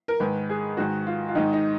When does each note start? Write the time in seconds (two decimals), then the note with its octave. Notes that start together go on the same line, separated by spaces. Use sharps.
0.08 A#4
0.20 G#2 D#3 B4
0.49 G#4
0.77 G#2 D#3 F#4
1.07 F4
1.28 F4
1.35 G#2 D#3 D#4
1.53 D#4